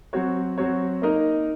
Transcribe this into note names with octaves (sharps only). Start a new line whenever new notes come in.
F#3 C4 F#4 C#5
F#3 C4 F#4 C#5
A#3 D#4 A#4 D#5